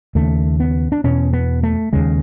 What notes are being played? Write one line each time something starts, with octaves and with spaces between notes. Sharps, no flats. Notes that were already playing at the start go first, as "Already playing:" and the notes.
D#2 C#3 A3
B3
D4
E2 B2 C#4
B3
A3
D#2 C#3 G#3